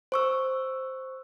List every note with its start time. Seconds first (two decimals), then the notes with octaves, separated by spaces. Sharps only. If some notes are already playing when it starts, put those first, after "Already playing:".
0.12 C5 C#6 E6